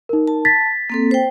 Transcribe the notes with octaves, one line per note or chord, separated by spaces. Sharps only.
D#4 A#4
A5
A6 B6
A#3 C4 A4
C5 G5